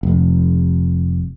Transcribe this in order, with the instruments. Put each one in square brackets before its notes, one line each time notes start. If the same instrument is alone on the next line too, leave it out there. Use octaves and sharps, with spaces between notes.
[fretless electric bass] F1